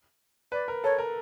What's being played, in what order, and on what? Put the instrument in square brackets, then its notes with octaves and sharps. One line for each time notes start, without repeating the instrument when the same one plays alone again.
[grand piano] B4 [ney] D5
[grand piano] A#4
[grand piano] A4 [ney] C#5
[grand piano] A#4